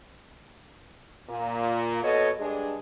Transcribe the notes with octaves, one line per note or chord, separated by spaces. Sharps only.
A#2
B2 A4 C#5 D#5
G2 G#3 D4 G#4